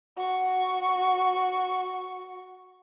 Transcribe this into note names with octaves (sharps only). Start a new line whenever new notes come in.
F#4 C#6